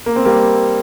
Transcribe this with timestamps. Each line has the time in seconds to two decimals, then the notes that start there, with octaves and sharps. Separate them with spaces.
0.06 A#3
0.16 C4
0.25 G3 A#3